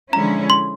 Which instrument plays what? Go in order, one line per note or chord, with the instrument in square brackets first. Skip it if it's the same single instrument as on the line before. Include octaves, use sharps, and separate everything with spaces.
[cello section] D3 F3 G#3 C#4 E4 [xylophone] A#5
[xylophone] C6